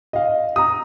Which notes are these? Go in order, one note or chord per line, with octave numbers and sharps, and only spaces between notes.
D#5 F5
A#5 D#6